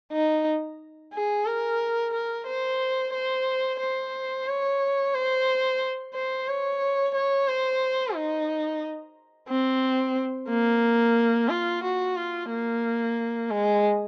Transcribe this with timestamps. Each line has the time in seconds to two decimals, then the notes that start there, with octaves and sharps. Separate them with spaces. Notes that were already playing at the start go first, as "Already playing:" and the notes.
0.12 D#4
1.13 G#4
1.46 A#4
2.13 A#4
2.47 C5
3.14 C5
3.80 C5
4.48 C#5
5.14 C5
6.14 C5
6.48 C#5
7.14 C#5
7.48 C5
8.15 D#4
9.49 C4
10.49 A#3
11.49 F4
11.83 F#4
12.16 F4
12.50 A#3
13.50 G#3